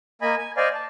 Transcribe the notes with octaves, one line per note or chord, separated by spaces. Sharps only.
A#3 D#5 G#5 B5
G#5
C5 D5 D#5 F5 G#5
A5